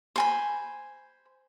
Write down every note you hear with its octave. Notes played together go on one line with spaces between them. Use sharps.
C5 G#5 B5